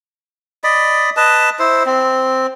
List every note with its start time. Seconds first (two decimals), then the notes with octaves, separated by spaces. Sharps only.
0.64 D5 D#5 B5
1.17 B4 D#5 A5
1.59 E4 C5
1.86 C4